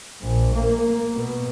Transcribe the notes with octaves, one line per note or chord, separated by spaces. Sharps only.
A#1
A#3
B2